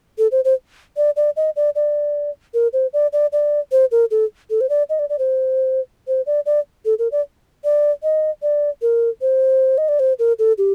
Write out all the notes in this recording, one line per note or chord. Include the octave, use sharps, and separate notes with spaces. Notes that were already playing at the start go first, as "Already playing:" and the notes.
A4
C5
C5
D5
D5
D#5
D5
D5
A#4
C5
D5
D5
D5
C5
A#4
A4
A4
C5
D5
D#5
D5
D5
C5
C5
D5
D5
A4
A#4
D5
D5
D#5
D5
A#4
C5
D#5
D5
C5
A#4
A4
G4